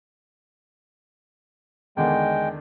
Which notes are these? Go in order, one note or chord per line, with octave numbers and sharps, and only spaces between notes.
E2 D3 D#3 G#3 G5